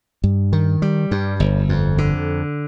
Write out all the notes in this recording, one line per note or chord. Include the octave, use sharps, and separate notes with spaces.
G2
D#3
G3
G2
G1
F2
D3